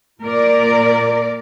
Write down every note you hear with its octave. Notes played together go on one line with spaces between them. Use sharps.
A#2 A#4 D5